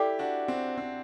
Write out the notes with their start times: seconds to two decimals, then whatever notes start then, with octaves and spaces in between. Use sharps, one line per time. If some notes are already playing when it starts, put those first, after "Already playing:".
Already playing: E4 G4 A4 D5 G5 D6
0.19 D4 F#4
0.48 C4
0.78 C4